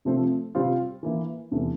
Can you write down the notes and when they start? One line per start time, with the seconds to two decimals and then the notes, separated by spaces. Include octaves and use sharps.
0.05 C3 F3 A3 C4
0.55 C3 G3 C4 F4
1.03 E3 A#3 E4
1.51 E2 C3 E3 A3